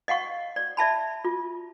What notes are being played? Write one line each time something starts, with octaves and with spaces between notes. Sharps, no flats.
D#5 F5 F#5 C#6
D5
D5 E5 A5 B5
F4